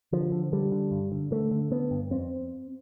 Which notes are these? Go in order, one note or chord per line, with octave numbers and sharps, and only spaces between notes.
D3 F3
D3
D3 G3
D3
G2
D3
D3 A3
D3
D3 B3
G2
F2 C4